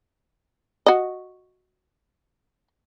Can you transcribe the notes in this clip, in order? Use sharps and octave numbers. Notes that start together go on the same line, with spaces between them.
F#4 D#5